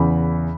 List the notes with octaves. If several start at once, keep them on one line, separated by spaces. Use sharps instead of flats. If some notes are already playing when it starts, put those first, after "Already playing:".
Already playing: E2 C#3 E3 B5